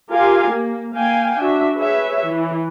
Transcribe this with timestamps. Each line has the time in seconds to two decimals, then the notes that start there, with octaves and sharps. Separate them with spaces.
0.12 F4 G4 A#4 F5 G#5
0.52 A#3
0.95 A#3 F5 G5 G#5
1.41 D4 F#4 E5
1.77 G#4 B4 C#5 E5
2.26 E3